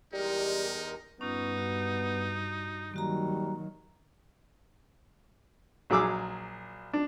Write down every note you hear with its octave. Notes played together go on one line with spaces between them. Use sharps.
E2 G3 G#3 D#4 G4 A#4
G2 B3 C#4 D#4 F4
F#4
D#3 F#3 G3 A#3 F#4 A#5
A#1 F#3 G#4 D6 E6
D4